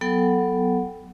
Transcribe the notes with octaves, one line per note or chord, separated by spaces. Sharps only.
F#3 B3 A4 F#5 G5